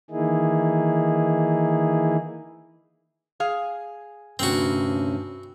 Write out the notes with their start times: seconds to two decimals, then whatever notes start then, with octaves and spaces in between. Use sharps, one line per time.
0.11 D#3 E3 A#3 D#4 E4 G#4
3.40 G#4 F5
4.39 D2 G2 C3 C4 C#4 F#4